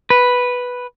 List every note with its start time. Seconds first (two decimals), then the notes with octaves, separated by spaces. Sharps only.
0.10 B4